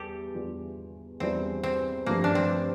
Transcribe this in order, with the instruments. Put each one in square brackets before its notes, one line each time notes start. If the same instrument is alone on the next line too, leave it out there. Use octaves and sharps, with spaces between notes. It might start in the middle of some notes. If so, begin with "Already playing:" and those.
Already playing: [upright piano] E2 G3 [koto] G4 A4
[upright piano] E2 E3 G3 D4 F4
[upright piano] E2 E3 G3 D4 F4 [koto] C4
[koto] C4
[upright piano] G2 F3 A3 [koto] A#3
[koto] D4
C4